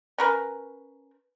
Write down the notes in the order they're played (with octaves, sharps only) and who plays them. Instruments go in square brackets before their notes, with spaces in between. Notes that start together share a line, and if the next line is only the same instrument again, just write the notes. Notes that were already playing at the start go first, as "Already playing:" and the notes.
[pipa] C#4 A#4 B4